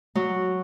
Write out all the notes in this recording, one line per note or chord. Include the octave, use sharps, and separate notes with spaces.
F#3